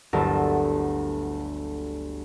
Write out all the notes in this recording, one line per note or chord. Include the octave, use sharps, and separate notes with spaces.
G1 D2 F#3 E4 A#4 A5